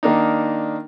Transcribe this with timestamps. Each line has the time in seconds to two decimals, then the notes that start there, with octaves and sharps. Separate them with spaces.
0.03 D#3 A#3 D4 D#4